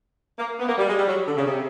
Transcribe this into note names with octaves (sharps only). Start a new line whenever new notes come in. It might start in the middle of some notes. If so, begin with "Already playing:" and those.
A#3
B3
A#3
G3
G#3
G3
F#3
D3
C#3
C3